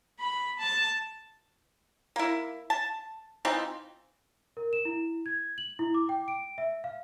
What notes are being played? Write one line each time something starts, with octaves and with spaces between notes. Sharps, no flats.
B5
A5
A#3 E4
A5
E3 F3 C4 D#4
A#4
E7
E4
G#6
F#7
E4
D6
G5
D7
E5
F5